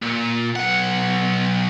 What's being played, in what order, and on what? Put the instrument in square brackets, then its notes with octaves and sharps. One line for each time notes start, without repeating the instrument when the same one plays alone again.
[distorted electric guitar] A#2
B1 F#5